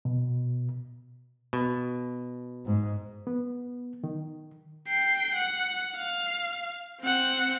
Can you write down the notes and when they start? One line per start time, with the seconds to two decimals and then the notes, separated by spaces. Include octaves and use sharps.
0.05 B2
1.53 B2
2.66 G#2
3.27 B3
4.04 D#3
4.88 G5 C7
5.36 F#5
5.97 F5
7.01 C4 F#5